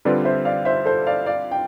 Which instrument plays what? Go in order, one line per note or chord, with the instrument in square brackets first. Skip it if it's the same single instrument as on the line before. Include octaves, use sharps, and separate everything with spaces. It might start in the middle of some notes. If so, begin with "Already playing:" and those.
[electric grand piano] D3 G3 C4 F4 [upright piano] B4 D5
[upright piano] C5 E5
D5 F5
C5 E5
A4 C5
D5 F5
D5 F5
G5